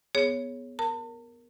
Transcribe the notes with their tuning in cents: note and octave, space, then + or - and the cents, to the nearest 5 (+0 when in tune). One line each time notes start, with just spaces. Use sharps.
B3 +0 G#4 +0 C#5 +0
A#4 +0 A5 +40